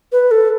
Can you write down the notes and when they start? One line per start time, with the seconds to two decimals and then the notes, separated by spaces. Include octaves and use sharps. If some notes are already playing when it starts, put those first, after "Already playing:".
0.12 B4
0.31 A4